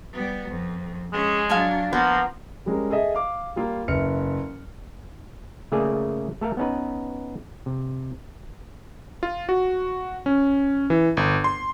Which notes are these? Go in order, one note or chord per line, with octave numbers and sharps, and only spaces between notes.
G3 B3
F2
G#3 C#4 G#4
F#3 D4 F5 G#5 A5
F3 A#3 B3 B4
G3 G#3 C#4 A#4
G#4 A4 D#5 E5
F5 D6
G3 A#3 F4
F#1 B4 E5 F6 C#7
C#3 A3 A#3 G#4 D5 G#5
A3 A4 A#4 F5
B3 C#4 D#4 B4
C3
F4
F#4
C#4
E3
G1
C6